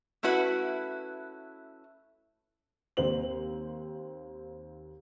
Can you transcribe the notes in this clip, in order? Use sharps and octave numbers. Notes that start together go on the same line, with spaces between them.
A3 C#4 E4 F#4 B4
D#2 C4 C5 F#7